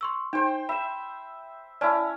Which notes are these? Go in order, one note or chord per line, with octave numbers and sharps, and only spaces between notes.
C6 C#6 E6
D#4 C5 G5
E5 B5 E7
C#4 E4 D5 A5